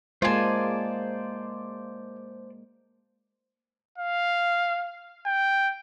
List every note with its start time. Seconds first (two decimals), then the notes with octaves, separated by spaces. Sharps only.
0.22 G#3 A#3 F4 C5 D5 G#5 A5
3.98 F5
5.26 G5